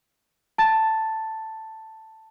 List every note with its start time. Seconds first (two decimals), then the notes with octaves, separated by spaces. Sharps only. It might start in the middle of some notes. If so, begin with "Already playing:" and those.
0.58 A5 A6